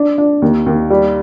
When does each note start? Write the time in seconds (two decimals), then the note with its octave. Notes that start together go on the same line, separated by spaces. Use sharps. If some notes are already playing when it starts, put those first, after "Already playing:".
Already playing: D4
0.18 D4
0.42 D#2
0.66 D#2
0.90 G3